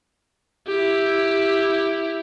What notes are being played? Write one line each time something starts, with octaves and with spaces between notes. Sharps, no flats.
E4 G4